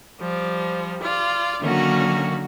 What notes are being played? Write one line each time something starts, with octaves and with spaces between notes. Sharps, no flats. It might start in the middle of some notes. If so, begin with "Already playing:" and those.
F3 G3
F4 D5
D3 D#3 F#3 A#3 C#4 F#4